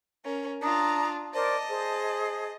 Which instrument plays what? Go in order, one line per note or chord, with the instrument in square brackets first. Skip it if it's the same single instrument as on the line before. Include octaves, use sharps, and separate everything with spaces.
[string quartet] C#4 A#4
[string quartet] D4 F4 [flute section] A#5 D#6
[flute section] A#4 C5 D5 [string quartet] D#5 A5
[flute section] G#4 C5